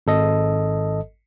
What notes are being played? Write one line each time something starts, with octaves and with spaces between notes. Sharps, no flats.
G#1 A4 D#5